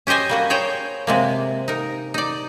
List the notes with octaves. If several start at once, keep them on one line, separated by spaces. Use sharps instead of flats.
C#4 G4 C5 D#5 G#5
G3 A#3 F#4
G#4 C5 C#5 G5
C3 G#3 A#3
D#4 A#4
D#4 D5